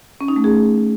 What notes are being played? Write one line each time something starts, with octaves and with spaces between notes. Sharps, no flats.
C#4
D#4
A3
G#4